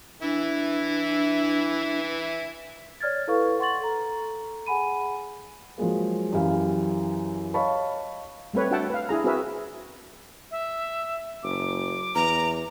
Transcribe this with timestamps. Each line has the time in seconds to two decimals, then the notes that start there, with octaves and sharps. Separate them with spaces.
0.22 E3 D4 E4
3.01 C#5 D5 F6 G#6 A6
3.27 E4 A4 B4 F5 C#6
3.59 F#5 C6 C#6 A6 F#7
3.81 A4 A#5
4.66 G#4 F#5 G#5 B5 D#7
5.78 F3 F#3 G#3 A#3
6.33 F#2 E3 G4 F5
7.54 C#5 D#5 F5 A5 B5 C#6
8.54 G3 A3 C4 B4 C#5
8.71 D4 F#4 E5 F#5 G5 A5
8.90 B4 F5
9.09 D4 E4 G#4 A#5
9.24 C4 F#4 G#4 A#4 B4 E5
10.51 E5
11.43 F#1 D6
12.15 E2 A#5